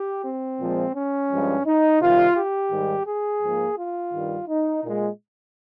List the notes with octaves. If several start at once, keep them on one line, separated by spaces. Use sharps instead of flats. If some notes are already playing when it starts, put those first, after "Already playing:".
Already playing: G4
C4
A#2 F3 G#3
C#4
G2 F3 G#3
D#4
C3 D#3 G3 F4
G4
G#2 D#3 G3
G#4
G#2 F3 A#3
F4
G2 D#3 G3
D#4
A#2 G#3